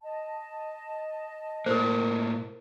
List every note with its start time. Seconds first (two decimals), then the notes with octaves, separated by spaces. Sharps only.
0.02 D#5 A5
1.66 A2 A#3 A#4 C5